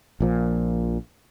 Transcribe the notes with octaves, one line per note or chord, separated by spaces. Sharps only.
A#1 A#2 F3